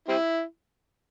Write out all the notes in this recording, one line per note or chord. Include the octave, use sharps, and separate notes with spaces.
G3 C4 E4